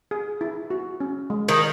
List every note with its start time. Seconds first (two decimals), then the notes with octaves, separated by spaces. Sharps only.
0.11 G#4
0.41 E4
0.70 F#4
1.00 C#4
1.30 G#3
1.49 D#3